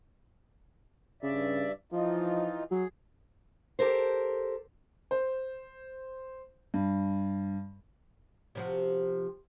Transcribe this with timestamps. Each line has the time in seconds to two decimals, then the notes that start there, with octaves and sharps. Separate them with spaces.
1.23 G2 C#3 D5 E5
1.92 E3 F3 D#4 F4
2.71 F#3 G#4
3.79 G4 A4 A#4 C5
5.11 C5
6.74 G2
8.55 C3 F3 F#4